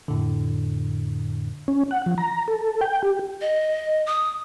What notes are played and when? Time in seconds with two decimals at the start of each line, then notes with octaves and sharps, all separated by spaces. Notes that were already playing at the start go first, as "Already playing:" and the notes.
0.08 F2 A2 D3
1.68 C#4
1.91 F#5
2.06 F3
2.18 A#5
2.48 A4
2.81 G5
3.03 G4
3.41 D#5
4.07 D#6